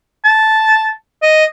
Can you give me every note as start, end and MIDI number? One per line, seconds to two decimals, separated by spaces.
0.25 0.90 81
1.22 1.45 75